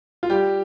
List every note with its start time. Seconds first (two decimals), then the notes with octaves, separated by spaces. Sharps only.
0.23 F4
0.30 G3 G4